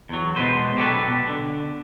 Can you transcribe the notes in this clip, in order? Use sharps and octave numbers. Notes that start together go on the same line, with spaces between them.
E2 F#3
B2 F3 G#3 B4 C5
F#3 G4 A4 B4
B2
D3